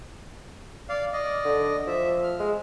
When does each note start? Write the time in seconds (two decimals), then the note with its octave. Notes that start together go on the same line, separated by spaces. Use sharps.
0.89 D5 F5
1.13 D5 D#5
1.45 D3
1.87 F3 E5
2.24 F6
2.40 G#3